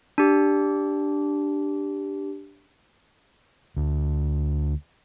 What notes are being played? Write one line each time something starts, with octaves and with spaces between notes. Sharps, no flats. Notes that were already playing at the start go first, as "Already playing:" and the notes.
D4 G4
D2